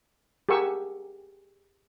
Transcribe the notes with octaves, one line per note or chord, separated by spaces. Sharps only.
G4 G#4 A#4 F#5 C#6 E6